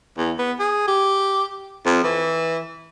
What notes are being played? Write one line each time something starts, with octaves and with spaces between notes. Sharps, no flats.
E2
B3
G#4
G4
F2
E3